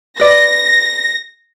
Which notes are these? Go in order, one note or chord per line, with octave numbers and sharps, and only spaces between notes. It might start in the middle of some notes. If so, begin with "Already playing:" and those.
B4 D5 A#6